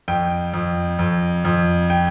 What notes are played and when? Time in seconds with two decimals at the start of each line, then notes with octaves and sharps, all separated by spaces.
0.08 F2 G5
0.54 F2
0.99 F2
1.45 F2
1.90 G5